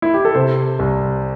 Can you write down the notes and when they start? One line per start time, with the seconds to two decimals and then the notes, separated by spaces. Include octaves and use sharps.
0.02 E4
0.14 G4
0.25 A4
0.35 C3 C5
0.79 C2